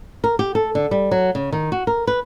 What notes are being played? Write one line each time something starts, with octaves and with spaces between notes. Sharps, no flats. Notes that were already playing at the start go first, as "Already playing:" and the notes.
A#4
G4
A4
D3
G3
F#3
C#3
D#3
F#4
A#4
B4